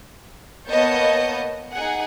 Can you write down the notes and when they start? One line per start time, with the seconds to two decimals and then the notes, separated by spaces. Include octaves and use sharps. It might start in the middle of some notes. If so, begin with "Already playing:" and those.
0.68 A#3 B3 C#5 D#5 A5 G6
1.73 D#4 G#4 F#5